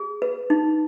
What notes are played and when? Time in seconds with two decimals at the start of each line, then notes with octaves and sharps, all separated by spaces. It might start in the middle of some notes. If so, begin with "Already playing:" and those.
Already playing: G#4
0.22 B4
0.50 D#4